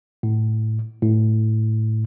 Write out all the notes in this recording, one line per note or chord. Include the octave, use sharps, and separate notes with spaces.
A2
A2